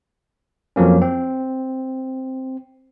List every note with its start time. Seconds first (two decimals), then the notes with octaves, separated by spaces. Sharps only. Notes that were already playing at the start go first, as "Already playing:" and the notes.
0.76 F2 F3 F#3 A#3 C#4
1.02 C4